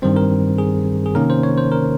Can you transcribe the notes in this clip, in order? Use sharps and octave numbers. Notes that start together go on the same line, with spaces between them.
G2 D#3 G3 C4 C5
A#4
G#4
G#4
C3 D#3 A#3 C#4 A#4
C5
C#5
C5
A#4